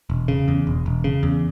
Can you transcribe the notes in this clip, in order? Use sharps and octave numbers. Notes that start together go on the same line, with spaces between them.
E1
C#3
E2
E1
E1
C#3
E2